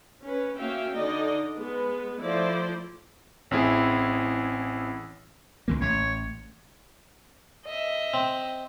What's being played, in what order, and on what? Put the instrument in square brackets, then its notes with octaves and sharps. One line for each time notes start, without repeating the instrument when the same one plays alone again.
[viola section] C#4 B4
A#3 C#4 F#4 E5 F5 G5
D3 D#4 D5 D#5
G#3 B3 B4
F3 A3 E4 C5 D5
[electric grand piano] A1 C4 E4 G#4
[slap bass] C#2 E3 A#3
[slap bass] A1 [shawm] C#5
[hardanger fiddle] D#5 E5
[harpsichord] C4